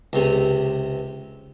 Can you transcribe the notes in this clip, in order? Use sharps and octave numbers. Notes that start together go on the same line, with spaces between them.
C#2 C3